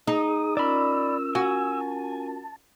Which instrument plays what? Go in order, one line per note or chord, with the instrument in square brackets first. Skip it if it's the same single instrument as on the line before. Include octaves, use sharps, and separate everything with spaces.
[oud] D#4 [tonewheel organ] G#4 D#6
[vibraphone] C#4 F4 A#4 [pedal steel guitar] D5 B5 [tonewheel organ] E6
[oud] F#4 [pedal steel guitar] G#5
[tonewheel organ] A5